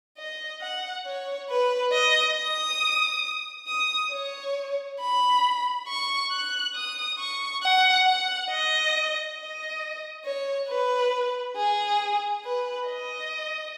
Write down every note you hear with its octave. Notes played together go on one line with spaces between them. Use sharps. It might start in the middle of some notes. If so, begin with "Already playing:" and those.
D#5
F#5
C#5
B4
D#5
D#6
D#6
C#5
B5
C#6
F#6
D#6
C#6
F#5
F#5
D#5
D#5
C#5
B4
G#4
B4
D#5